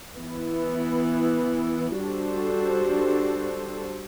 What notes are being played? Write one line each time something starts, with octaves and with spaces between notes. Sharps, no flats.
E3 B3 E4
G3 D4 F#4 A4 C5